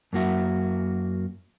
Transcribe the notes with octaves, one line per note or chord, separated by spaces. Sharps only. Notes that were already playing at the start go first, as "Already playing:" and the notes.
F#2 A#3 F#4 E5